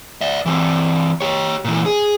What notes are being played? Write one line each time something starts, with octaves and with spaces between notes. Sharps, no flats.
D5 E5
E3 C4
G4 C#5
A#2 E3
G#4